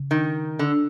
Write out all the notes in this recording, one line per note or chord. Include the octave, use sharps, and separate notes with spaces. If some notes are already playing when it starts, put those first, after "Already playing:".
Already playing: C#3
D#3
D3